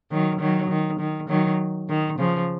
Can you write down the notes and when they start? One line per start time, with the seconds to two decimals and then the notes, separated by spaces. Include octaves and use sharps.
0.11 D#3 F#3
0.40 D#3 F#3
0.70 D#3
0.99 D#3
1.29 D#3 F#3
1.89 D#3
2.19 C#3 F3